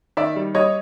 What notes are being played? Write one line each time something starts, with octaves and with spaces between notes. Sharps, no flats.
D#3 D5 E5
G3
G3 C#5 D#5